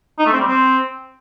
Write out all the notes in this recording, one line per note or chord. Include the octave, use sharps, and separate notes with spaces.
D#4
A3
C4
G3
C4